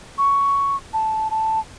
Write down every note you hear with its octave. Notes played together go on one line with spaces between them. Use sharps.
C#6
A5
A5